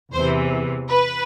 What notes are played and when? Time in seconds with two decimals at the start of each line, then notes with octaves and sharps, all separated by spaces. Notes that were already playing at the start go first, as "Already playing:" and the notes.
0.13 E2 C3 E3 C5
0.90 B4